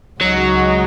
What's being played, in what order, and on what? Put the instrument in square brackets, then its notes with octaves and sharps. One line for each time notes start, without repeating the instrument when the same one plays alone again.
[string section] C#2 C#3 G#3 D#4 F#4 [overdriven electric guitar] F#3